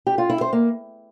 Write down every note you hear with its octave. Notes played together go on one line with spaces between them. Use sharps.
G4
F4
E4
C5
A#3